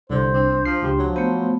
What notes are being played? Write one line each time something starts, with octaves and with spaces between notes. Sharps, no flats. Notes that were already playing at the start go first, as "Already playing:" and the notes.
C2 D3 C5
C4 D4
F3 C7
C#2 G4 C6
F3 F#3
A3 B3 C5